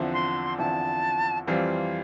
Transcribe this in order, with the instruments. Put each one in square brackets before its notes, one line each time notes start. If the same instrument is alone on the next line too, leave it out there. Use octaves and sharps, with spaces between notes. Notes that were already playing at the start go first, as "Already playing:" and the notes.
Already playing: [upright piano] E2 D3 F3 C4 E4
[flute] C6
[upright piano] E2 D3 F3 C4 E4 [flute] A5
[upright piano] F2 E3 G3 C4 F4 [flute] F5